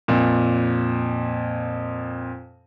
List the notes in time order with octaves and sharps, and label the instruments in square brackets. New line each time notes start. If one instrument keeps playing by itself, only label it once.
[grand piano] F2 A#2